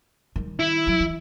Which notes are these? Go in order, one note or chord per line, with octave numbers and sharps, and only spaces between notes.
D#3 G3
E4
F#3
E3